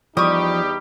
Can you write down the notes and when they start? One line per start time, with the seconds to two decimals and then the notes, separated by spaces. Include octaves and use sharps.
0.17 E2 F3 G3 D#4 G4 C#6 D#6